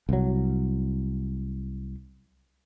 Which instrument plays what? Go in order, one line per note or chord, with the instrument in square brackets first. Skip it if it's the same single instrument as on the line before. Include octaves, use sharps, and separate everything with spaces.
[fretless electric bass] C2 F#3